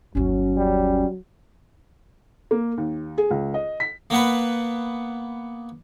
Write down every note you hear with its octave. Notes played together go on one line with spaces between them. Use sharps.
G1 D#2 F#3 C#4
G3
A#3
D#2
G#4
C#2
D#5
B6
A#3 B3 B4